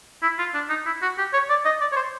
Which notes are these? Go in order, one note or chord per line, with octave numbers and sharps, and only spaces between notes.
E4
F4
D4
D#4
E4
F#4
G4
C#5
D5
D#5
D5
C#5
C5